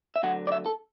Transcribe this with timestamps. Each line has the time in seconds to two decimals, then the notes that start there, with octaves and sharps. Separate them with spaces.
0.16 E5
0.23 D2 D3 F#3 F#5
0.47 D5
0.52 E5
0.66 A4